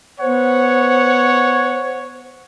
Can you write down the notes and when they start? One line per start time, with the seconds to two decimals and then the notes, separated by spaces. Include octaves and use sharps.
0.20 B3 C5 C#5 F#5